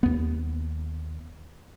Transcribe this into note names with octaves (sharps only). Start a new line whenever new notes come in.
D#2 B3